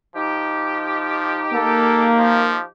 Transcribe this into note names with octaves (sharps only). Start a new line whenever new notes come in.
F3 D#4 G4
A#3 A4
F3